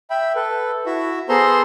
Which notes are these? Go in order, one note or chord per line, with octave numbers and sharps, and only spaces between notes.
E5 G5 B5
A4 B4
E4 F#4 E5
B3 G#4 A4 C5 A#5 C6